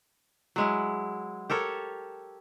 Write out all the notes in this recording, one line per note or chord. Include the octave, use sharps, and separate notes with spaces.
F#3 G#3 E4
G4 A4 A#4 C#5